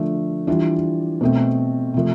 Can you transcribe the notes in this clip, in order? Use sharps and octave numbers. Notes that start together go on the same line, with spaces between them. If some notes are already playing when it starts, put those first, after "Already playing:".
Already playing: D3 F3 A3
E3 G3 D4 F4
B2 A3 C4
C3 F3 A3